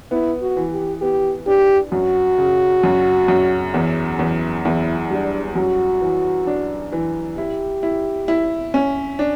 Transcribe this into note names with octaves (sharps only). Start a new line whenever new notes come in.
B3 E4
F#4
E3
G4
B3 G4
D4 G4
F#2 F#4
C#3
F#2
F#2
E2
E2
E2 E4
G3 D4
F#2 F#4
E3
D4
E3
E4 G4
E4
E4
C#4
D4